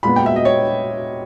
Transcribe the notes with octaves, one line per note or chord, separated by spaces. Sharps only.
A#2 G#3 B3 B5
G5
E5
D#5
C#5